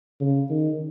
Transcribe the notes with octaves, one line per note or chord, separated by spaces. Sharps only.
C#3
D#3